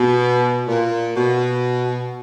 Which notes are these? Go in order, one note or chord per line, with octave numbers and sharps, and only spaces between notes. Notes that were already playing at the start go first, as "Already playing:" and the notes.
Already playing: B2
A#2
B2